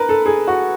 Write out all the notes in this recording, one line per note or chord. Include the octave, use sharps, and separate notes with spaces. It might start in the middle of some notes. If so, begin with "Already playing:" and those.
Already playing: A#4 B4
A4
G#4
F#4